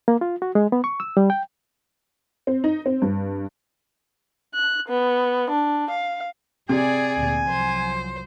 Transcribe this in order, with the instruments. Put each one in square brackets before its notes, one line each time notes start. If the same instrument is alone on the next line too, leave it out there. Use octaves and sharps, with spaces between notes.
[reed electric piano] A#3
F4
F#4
G#3
B3
C#6
E6
G3
G5
[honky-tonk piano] C4
D#4
C4
G2
[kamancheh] F#6
B3
D4
F5
[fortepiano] C3 [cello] G#4 D5 [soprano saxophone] G#5
[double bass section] D2 A#2
[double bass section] C2 F3 F#3 [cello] C5